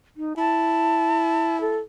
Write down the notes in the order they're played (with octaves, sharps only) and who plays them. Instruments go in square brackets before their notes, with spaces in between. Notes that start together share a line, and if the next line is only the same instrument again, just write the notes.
[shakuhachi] D#4
[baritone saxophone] E4 [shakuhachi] A5
[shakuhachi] A4